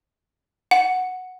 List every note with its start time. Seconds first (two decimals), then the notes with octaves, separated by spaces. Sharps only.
0.71 F#5